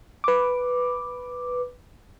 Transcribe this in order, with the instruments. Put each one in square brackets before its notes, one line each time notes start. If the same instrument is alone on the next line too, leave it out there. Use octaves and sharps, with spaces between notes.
[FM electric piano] B4 D6